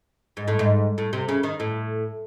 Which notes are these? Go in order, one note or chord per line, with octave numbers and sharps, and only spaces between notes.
G#2
A2
G#2
A2
C3
C#3
D#3
A2